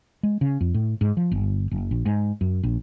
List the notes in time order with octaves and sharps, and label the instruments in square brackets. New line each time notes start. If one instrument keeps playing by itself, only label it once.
[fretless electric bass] G#3
C#3
F2
A2
G#2
F3
G1
F#1
A#1
G#2
F#2
A#1